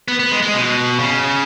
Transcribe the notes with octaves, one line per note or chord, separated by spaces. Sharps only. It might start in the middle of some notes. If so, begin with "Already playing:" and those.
B3
B3
G#3
G#3
B2
C#3